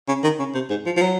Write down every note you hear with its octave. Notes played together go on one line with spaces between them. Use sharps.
C#3
D#3
C#3
C3
G#2
F3
F3
F#3